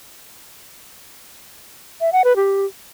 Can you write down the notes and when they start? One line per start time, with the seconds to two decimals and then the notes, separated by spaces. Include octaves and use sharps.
2.01 E5
2.13 F#5
2.24 B4
2.36 G4